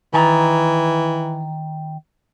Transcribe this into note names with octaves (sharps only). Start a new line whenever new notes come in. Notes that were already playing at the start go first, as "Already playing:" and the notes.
D#3 E3 G#5 A#5